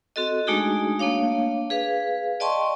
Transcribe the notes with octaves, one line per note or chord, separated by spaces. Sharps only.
C4 F#4 A4 D#5
G#3 A3 D4 D#4 F#4 G#4
A3 A#3 D4 C#5 F5
G#4 B4 F5
D5 D#5 G5 A5 C6 C#6